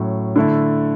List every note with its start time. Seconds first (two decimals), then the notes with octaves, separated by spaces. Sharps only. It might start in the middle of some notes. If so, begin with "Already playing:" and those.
Already playing: A2 F#3 C#4
0.36 D3 A3 E4